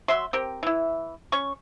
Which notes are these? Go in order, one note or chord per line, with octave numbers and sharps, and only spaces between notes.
F#3 E5 C6
C4 G4 A#4
E3 E4
C#4 C#6